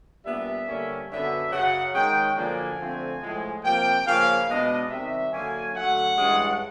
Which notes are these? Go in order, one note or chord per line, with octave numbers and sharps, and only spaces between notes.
A#2 G3 B3 D4 E5
D3 G3 A#3 C#4
F#2 D3 F#3 B3 D4 E5
F#2 C#3 F#3 F#5
D#3 G#3 C#4 G5
F#2 D3 F3 A#3 D4 G#5
D3 F3 A3 C4
A2 F3 G#3
C3 F3 A#3 G5
C#3 F3 A#3 C#4 F5
B2 G#3 B3 D4 D#5
C3 D#3 G3 E5
D3 F#3 A#3 C#4 G#5
D3 F#3 A3 F#5
G2 E3 G#3 C#4